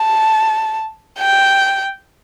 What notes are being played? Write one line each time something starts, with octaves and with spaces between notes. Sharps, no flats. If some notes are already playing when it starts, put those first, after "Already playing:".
Already playing: A5
G5